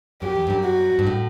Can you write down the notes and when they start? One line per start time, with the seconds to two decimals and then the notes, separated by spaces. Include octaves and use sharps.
0.22 F#2 G4
0.36 E2
0.47 G2
0.50 F#2
0.64 F#4
0.99 G2
1.07 A2